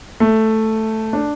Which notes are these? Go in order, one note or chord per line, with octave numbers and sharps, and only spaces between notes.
A3
D4